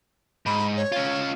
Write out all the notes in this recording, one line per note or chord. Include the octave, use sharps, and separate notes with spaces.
G#2 B5
C#5
C#4 F4